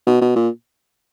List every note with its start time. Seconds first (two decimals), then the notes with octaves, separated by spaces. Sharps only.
0.07 B2
0.21 B2
0.36 A#2